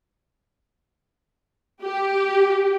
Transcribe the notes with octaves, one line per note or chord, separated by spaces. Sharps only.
G4